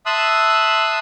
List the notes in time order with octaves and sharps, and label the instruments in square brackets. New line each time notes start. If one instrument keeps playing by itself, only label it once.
[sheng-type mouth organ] E5 A5 C6 D#6 E6 F#6